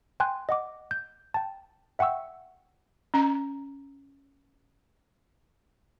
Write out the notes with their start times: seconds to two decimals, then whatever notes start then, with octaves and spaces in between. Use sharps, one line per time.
0.20 G5 G#5 C6 F#6
0.49 D#5 F#5 D6
0.91 G6
1.34 G5 A5
1.99 E5 F#5 G5 C#6 E6
3.14 C#4 A#5